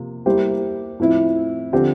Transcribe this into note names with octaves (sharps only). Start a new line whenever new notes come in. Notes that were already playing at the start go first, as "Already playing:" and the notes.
Already playing: C3 F3 A#3
G3 A#3 E4 G4 C5
A2 F3 C4 E4
D3 F3 C4 G4